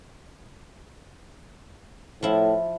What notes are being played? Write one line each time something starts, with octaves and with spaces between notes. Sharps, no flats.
A2 F3 E4